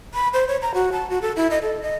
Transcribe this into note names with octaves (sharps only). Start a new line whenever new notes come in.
B5
C5
C#5
A#5
F#4
A5
F#4
A4
E4
D#5
A4
D#5